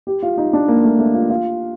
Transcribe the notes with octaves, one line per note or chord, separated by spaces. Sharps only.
G4
F4
D#4
D4
A#3
A3
A3
F4
F4